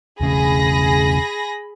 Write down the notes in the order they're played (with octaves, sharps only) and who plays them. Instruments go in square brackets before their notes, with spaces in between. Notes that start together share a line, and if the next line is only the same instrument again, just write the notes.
[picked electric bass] E1 C#3 [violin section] G#4 B5 A#6